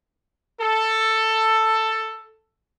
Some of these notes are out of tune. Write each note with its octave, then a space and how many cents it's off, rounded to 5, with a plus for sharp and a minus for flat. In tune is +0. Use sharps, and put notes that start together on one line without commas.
A4 +10